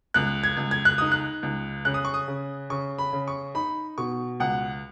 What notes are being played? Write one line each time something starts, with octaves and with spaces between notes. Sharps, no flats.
C#2 F#6
G#6
C#2
G#6
F#6
D#4 D#6
F#6
C#2
C#3 F#6
D#6
C#6
D#6
C#3
C#3 C#6
B5
C#3
C#6
D#4 B5
B2 C#6
C#2 F#5